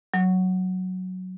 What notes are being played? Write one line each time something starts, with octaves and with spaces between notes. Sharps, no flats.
F#3